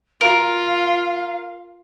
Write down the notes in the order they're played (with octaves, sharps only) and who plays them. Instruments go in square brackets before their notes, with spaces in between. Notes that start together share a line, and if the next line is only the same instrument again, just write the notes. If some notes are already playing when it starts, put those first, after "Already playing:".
[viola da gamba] F4 [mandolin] A#4 [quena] F5